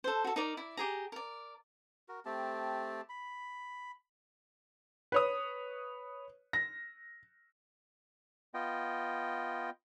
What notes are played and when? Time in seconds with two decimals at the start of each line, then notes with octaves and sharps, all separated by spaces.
0.04 A4 C5
0.24 F#4 A4
0.36 D#4 A#4 D5
0.57 E4 D5
0.77 G4 G#4 A#5
1.12 A#4 D5
2.09 F#4 A#4
2.25 A3 C4 G4 A5
3.09 B5
5.12 B4 C#5 D#6
6.53 A#6
8.54 B3 F4 D#5 G5